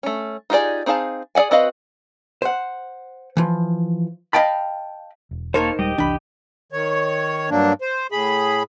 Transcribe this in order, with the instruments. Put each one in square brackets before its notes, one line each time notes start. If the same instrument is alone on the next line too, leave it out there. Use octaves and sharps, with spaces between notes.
[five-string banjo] A3 C#4
D#4 F4 G4 G#4 D5
C4 D#4 G#4 F5 A5
G#4 D5 E5 F#5 G#5
C4 F#4 B4 D#5 F5
[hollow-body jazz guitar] C5 F#5
E3 F3
D#5 F5 G5 A5 B5
[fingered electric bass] E1
[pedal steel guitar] A#3 A4 C#5 [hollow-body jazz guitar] D#4 A#4 C5
[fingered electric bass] D#1 G3 G#3 [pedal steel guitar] G4 D#5
[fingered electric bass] F1 C2 E3 [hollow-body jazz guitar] D4 B5
[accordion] D#3 C#5
G2 F#3 A#3 D4
C5
A2 G#4 B5